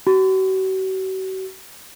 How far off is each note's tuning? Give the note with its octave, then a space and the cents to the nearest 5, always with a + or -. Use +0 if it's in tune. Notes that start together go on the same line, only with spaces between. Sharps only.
F#4 +40